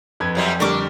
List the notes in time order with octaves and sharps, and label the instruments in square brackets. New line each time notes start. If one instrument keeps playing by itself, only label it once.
[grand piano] F2 B4 G#6
[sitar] F#2 F#3 G3
[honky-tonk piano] D3 G3 F6 [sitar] D4 [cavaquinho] A#4 C#6 D6